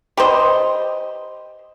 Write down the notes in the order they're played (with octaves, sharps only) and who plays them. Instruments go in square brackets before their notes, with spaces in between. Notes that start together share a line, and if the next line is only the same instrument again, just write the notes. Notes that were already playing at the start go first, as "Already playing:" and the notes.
[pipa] G4 B4 C5 D#5